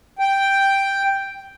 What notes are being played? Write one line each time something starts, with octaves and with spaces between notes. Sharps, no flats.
G5